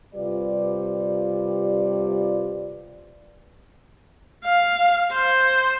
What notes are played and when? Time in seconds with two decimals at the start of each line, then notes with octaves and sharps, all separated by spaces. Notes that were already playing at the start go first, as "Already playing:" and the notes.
0.15 C3 G3 F4 B4 D5
4.44 F5
5.12 C5